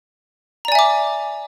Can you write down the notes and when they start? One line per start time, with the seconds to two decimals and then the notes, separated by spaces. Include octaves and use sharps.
0.65 A#5
0.68 D5
0.72 G#5
0.75 E5
0.79 D6